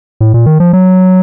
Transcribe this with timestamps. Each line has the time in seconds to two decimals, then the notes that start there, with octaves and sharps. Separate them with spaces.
0.21 A2
0.34 A#2
0.46 D#3
0.60 F3
0.73 F#3